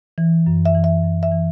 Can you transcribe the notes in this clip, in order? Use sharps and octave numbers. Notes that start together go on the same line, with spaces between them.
E3
F#2
E5
E3
E5
F#2
E5
E3